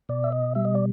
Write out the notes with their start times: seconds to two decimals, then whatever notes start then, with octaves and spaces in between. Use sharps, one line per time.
0.09 B2 D5
0.24 E5
0.32 D#5
0.55 G3 E5
0.65 D#5
0.75 D5